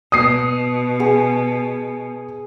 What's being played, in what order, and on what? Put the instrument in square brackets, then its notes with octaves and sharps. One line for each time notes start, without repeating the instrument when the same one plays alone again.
[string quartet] B2 [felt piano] D#6 C7
[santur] G#4